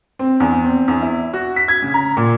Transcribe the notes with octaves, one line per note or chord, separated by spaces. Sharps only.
C4
E2
C4
E2
E4
F#4
B6
G#6
C#3
A#5
A#2